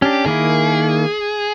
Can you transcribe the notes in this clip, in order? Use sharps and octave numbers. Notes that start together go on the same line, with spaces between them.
C#4 D4 G4
D#3 A#3 E4 G#4